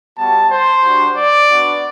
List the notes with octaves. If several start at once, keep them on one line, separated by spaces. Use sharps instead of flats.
G3 B3 F#4 A5
C5
G3 D4 F#4
D5
B3 D4 F#4